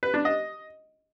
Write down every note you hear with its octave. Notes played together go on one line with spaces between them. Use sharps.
B4
D4
D#5